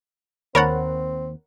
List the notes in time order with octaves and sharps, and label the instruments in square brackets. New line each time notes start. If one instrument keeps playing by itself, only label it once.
[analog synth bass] D#2 [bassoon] C4 [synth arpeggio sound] A#4 C#5 F#5 [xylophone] B5 A6